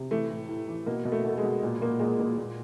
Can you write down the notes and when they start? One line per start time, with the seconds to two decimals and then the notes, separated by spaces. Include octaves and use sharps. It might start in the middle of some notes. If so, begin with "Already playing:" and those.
Already playing: C3
0.11 E3 A3
0.30 A2
0.49 A2
0.68 E3
0.86 B2 A#3
1.05 B2
1.12 A3
1.25 B2 A3
1.38 G#3
1.43 B2
1.63 A#2
1.81 A#2 A#3
1.99 A#2 G#3
2.19 A#2 A#3
2.38 A#2